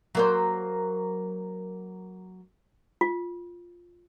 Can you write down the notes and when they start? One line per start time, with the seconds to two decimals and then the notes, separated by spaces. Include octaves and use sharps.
0.15 F#3 A#3 C5
3.01 F4